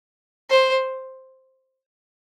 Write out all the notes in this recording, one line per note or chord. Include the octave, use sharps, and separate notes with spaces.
C5